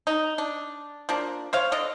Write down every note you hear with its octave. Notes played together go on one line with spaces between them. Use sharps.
D#4
D4
F3 A#3 D4
C5 C#5 F5
D3 D4 D#5